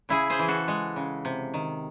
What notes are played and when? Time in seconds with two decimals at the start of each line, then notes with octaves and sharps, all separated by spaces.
0.09 C#3 E4 G#4
0.30 G#4 C5
0.39 E3
0.48 F#4 A4
0.68 G#3
0.96 C#3
1.25 C3
1.54 D#3